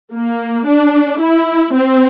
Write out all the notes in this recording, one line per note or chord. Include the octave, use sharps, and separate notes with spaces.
A#3
D4
E4
C4